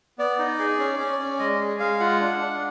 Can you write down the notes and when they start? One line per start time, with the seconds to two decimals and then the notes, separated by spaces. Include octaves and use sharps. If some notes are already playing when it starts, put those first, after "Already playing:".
0.18 B3 D5
0.39 D#4
0.59 G#4
0.79 C#4
0.99 C#4
1.19 C#4
1.39 G#3 D#5
1.60 G#4
1.80 G#3 F5
2.00 F4 F#5
2.20 D4
2.40 D4